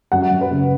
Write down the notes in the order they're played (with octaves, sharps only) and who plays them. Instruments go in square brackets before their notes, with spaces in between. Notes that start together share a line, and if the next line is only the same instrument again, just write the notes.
[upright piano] F#2 F#5
F#2
B4
C#3